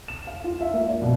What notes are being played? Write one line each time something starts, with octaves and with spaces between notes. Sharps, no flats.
E7
F5
F4
E5
A#3
D5
B2